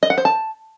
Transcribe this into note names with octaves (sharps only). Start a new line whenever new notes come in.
D#5
F#5
C5
A5